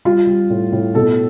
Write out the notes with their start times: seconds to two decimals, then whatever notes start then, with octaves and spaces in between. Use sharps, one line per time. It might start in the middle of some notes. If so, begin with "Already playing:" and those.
0.05 G3 F4
0.27 G3
0.50 A2
0.72 A2
0.94 B2 A4